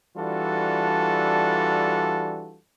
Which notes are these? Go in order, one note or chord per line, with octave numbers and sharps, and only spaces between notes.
E3 G3 D4 F4 F#4 A4